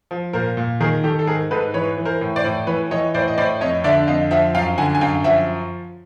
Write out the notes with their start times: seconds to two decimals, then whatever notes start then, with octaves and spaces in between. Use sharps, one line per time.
0.11 F3
0.33 A#2 A#4 C5
0.57 A#2
0.80 D#3 G#4 A#4
1.04 D#3 G4 A4
1.19 A4
1.27 G#2 G#4 A#4
1.51 G#2 A4 B4
1.74 E3 B4 C#5
1.97 E3
2.05 A#4 C5
2.21 A2
2.36 C5 D5
2.44 A2
2.67 E3 B4 C#5
2.91 E3 C#5 D#5
3.14 A2 C5 D5
3.28 D#5
3.38 A2 C5 D5
3.61 F2 C#5 D#5
3.84 D3 D5 E5
4.07 F2 D#5 F5
4.31 F3 E5 F#5
4.55 F#2 F5 G5
4.78 D3 F#5 G#5
4.95 G#5
5.01 F#2 F5 G5
5.24 F3 E5 F#5